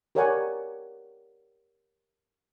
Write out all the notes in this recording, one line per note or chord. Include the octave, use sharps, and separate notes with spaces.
G4 A#4 C#5 D5 F#5 G#5